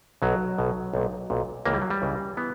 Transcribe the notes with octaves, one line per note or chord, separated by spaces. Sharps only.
B1 B2 F#3
B1 B2
B1 A#2
B1 A#2
C#2 C#3 E3 A#3
G3
F#3
G3
C#2 C#3 E3
E3 B3